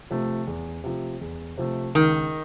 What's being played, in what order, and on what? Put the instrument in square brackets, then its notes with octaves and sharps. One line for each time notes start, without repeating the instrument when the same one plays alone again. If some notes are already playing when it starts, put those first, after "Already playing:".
[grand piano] C3 F3 A3
E2
C3 F3 A3
E2
C3 F3 A3
[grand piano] C#2 [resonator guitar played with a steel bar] D#3